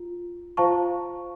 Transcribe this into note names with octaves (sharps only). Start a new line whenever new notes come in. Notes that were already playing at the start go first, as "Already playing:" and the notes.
Already playing: F4
F4 C5 F5 A5 C#6